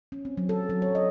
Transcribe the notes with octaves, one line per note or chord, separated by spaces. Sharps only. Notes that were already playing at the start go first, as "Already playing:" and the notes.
C#4
C4
F#3
A4
F#3
C#5
D#5